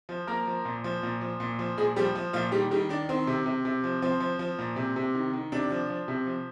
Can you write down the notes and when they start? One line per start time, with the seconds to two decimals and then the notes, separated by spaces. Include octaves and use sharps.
0.09 F3
0.27 F3 A#3 A#4
0.47 F3
0.65 A#2
0.84 F3
1.03 A#2
1.21 F3
1.40 A#2
1.59 F3
1.77 A#2 G#3 G#4
1.96 F3 G3 G4
2.15 F3
2.33 A#2 F3 F4
2.52 D#3 G3 G4
2.71 D#3 G3 G4
2.89 D#3 D4
3.09 D#3 C4
3.27 C3
3.46 C3
3.65 C3
3.84 F3
4.02 F3 C4
4.20 F3
4.39 F3
4.59 A#2
4.76 C3
4.96 C3
5.15 D#3
5.34 D#3
5.52 C3 D4
5.70 F3
5.90 F3
6.08 C3
6.27 F3